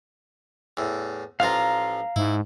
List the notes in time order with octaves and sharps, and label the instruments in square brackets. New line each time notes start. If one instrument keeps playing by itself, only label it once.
[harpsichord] E2 A2
[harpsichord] A1 F3 F4 [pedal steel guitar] F5 A#5
[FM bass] G#2 [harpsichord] E4